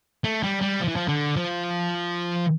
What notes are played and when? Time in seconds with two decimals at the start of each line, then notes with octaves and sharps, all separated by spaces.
0.24 A3
0.43 G3
0.61 G3
0.80 F3
0.88 E3
0.96 F3
1.08 D3
1.36 F3